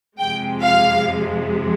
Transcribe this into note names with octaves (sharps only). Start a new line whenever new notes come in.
F2 C3 F3 G#3 G5
F5